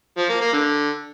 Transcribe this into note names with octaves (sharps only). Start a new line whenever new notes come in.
F3
A#3
A#3
D3